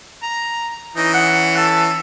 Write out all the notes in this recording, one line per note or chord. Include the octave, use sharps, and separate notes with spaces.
A#5
E3 C#4 D#4
F#5
A4